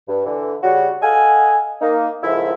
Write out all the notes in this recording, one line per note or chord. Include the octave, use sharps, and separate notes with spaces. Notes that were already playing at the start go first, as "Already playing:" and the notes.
G2
D3 E3
C#3 G3 F#4
A4 D#5 F5 F#5 G#5
A#3 D#4
C#2 G#2 D#3 F3 A3 E4